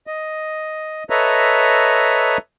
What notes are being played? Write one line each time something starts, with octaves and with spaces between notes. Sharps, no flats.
D#5
A4 B4 C#5 D#5 E5 A#5